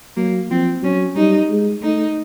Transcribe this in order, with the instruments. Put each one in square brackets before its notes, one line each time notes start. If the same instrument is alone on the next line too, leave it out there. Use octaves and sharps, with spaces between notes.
[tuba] F#3 [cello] A#3
[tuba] F3 [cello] C4
[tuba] F#3 [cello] C#4
[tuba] G3 [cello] D#4
[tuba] G#3
[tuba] A3 [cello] D#4